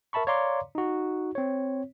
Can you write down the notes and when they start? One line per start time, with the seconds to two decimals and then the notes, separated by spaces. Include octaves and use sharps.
0.13 A#4 E5 A5 B5 C#6
0.27 C#5 D5 F5 A#5 C6 D6
0.75 D#4 F#4
1.35 C4 C#5